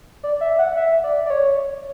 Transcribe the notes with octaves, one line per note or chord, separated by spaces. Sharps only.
D5
E5
F#5
E5
D5
D5
C#5